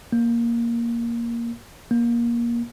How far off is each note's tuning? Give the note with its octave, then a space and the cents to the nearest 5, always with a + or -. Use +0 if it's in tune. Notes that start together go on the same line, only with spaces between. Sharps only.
A#3 +5
A#3 +20